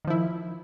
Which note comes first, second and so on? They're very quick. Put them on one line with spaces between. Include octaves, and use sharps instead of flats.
D#3 F3 E4